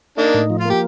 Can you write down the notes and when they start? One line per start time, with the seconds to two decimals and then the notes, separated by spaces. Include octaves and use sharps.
0.18 A#3 D4 D#4
0.34 A2
0.50 F3
0.60 F4
0.65 A#3 G4